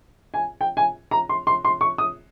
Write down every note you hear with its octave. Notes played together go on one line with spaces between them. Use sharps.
G#5
G5
G#5
A#5
C6
C6
C6
C#6
D#6